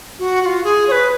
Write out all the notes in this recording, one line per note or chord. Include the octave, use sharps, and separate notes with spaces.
F#4
F#4
F4
G#4
C#5
B4